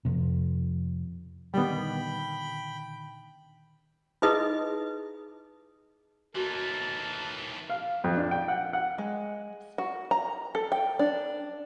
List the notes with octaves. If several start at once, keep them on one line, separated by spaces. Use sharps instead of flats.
F2 C3
A#2 D3 D#3 G3 B3 G5 B5
D#4 E4 G#4 B4 D#5 D#6
D#2 E3 F#4 A4 A#4
F5
F2
D4
G5
F#5
F#5
G#3
F#4
A#5
A4
G5
D4